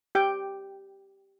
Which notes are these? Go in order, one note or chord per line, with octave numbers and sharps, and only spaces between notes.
G4 G5